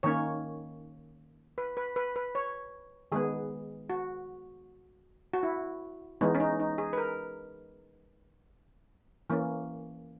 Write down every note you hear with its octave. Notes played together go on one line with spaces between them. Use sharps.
D#3 A#3 C#4 C#5
B4
B4
B4
B4
C#5
D#3 G#3 B3 G#4
F#4
F#4
E4
E3 G#3 B3 D#4
C#4
D#4
D#4
G#4
B4
A#4
E3 A#3 C#4